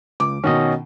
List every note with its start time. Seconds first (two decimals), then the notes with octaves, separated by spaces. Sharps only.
0.20 C#2 D6
0.44 B2 D#3 C#4 F#4 D#5